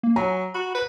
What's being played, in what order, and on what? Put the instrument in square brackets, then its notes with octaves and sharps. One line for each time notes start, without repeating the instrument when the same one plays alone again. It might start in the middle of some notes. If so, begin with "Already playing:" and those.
[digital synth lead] A#3
[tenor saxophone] F#3 [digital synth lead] G#5 [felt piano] A#5
[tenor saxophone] F#4 [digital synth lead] B5
[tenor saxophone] B4